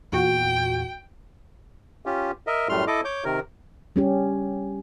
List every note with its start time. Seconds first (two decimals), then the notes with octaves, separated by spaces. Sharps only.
0.12 E2 A#2 F#4 G5
2.06 C#4 F4 G4
2.47 A#4 D#5 E5
2.69 F#2 A2 G3 A3 C6 F6
2.87 E4 A4 D#5 D6
3.05 C#5 D6 G6
3.24 C3 D#3 A#4
3.96 G3 C#4 G4